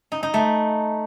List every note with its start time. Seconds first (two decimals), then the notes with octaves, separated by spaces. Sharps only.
0.12 D#4
0.23 D#4
0.34 A3